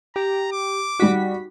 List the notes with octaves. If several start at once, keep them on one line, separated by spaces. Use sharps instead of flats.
G4 A#5
D6
G3 D#4 F#4 B6